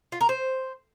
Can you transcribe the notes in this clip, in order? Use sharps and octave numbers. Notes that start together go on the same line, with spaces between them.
F4
A#4
C5